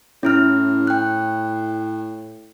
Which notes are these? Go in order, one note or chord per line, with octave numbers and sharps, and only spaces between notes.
A2 C#4 E4 F6
G5 F#6